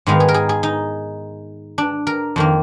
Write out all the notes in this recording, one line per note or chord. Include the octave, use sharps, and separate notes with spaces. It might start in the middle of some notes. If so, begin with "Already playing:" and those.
G#2 D#3 G#3 B3 F5
G#4
A#4
G#4
G#4
D#4
D4
A#4
F2 D#3 A#3